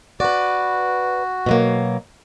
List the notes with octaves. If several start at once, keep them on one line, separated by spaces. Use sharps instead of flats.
F#4 B4 D5
B2 F#3 A#3